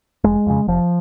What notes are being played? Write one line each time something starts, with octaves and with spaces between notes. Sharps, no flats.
F1 G#3
F2 C#3
F1 F3